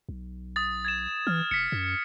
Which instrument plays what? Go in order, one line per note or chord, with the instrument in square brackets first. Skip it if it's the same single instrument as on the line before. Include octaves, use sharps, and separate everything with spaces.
[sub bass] B1
[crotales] D#6 A6
G#6 A6 E7
[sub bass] E3 [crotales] F6
[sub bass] F1 [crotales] B6 C#7
[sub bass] F#2